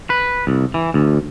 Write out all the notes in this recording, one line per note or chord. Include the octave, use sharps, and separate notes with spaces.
B4
C2
E3
D2